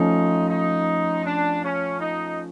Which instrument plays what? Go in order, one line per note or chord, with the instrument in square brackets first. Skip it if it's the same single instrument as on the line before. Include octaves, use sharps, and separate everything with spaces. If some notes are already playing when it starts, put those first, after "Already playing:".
Already playing: [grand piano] F3 A3 C#4 F4 [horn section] D#4
[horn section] D#4
D4
C#4
D#4